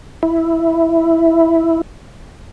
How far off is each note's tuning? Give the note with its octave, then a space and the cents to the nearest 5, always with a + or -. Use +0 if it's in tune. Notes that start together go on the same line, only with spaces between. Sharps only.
E4 +0